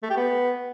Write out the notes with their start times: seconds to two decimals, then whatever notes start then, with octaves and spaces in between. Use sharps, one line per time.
0.03 A3
0.10 G4
0.17 B3